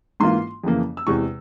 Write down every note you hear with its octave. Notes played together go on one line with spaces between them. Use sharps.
G#2 E3 A#3 F4 C6
F2 C#3 E3 A#3
E6
E2 C3 E3 G#3 C#6